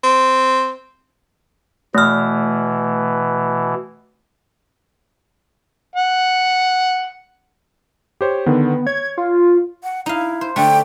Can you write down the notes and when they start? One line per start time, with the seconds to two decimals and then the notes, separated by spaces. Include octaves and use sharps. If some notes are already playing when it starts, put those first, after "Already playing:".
0.04 C4
1.95 B2 E3 A3 F6
5.96 F#5
8.21 G4 C5 C#5
8.46 D3 D#3 B3
8.87 C#5 G#6
9.18 F4
9.83 F#5
10.06 D#4 E4 F5
10.41 C5
10.56 D3 A3 G5